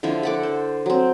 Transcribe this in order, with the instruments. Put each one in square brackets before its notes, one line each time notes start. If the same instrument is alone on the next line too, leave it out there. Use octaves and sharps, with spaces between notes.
[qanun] D3 F3 E4 F4
A4 F#5 D6
C5
F#3 C4